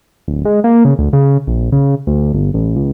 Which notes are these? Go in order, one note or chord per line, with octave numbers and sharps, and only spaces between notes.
D1
G#3
A#3
C#3
D2
C#3
A#1
C#3
D2
G1
A1
C#2